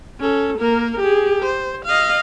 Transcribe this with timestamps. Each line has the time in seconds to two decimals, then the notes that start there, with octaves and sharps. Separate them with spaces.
0.20 C#4 A4
0.58 A#3 A#4
1.00 G4 G#4
1.43 C5
1.85 D#5 F5